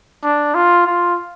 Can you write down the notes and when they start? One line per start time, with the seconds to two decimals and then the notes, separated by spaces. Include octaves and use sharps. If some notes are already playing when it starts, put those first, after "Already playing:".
0.24 D4
0.55 F4
0.87 F4